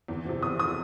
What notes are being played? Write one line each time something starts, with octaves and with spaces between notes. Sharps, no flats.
E2
C3 F3
E2 D#6
C3 F3 D#6